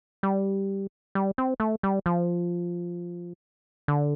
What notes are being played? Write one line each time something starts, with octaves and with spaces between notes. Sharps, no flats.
G3
G3
C4
A3
G3
F3
D3